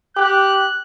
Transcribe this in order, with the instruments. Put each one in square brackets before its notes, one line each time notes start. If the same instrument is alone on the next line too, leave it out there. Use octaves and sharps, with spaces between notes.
[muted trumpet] G4 [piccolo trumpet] F#6